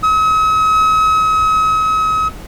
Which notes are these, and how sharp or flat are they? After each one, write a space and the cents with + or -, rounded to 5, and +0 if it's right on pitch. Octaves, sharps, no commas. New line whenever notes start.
D#6 +45